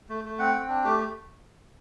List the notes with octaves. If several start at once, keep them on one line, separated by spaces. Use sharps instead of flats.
A3
A3
C4 F#5
C4
D4
A3 G4